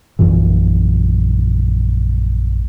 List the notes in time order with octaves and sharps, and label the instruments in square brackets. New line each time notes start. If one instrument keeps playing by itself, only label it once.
[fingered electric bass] A#1 F#2 A#2 E3